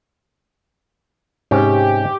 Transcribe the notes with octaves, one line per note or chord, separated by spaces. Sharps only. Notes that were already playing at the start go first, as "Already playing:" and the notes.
G#2 C3 C#4 G4